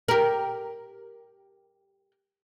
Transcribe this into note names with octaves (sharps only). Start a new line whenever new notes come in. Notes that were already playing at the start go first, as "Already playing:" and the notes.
G4 A#4